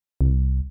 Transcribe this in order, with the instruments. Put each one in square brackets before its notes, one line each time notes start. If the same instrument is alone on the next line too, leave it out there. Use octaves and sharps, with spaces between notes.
[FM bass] C2